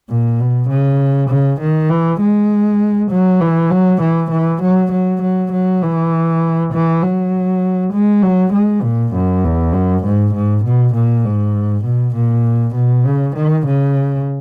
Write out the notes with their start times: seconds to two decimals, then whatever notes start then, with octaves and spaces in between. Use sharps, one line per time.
0.10 A#2
0.40 B2
0.69 C#3
1.30 C#3
1.61 D#3
1.90 E3
2.21 G#3
3.11 F#3
3.40 E3
3.71 F#3
4.02 E3
4.31 E3
4.62 F#3
4.92 F#3
5.22 F#3
5.52 F#3
5.82 E3
6.73 E3
7.03 F#3
7.93 G#3
8.23 F#3
8.53 G#3
8.83 A#2
9.14 F#2
9.44 E2
9.73 F#2
10.05 G#2
10.34 G#2
10.65 B2
10.94 A#2
11.25 G#2
11.84 B2
12.15 A#2
12.75 B2
13.05 C#3
13.36 D#3
13.66 C#3